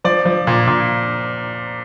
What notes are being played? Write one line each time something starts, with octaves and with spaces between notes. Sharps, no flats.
F3 D5
F3
A#2
A#2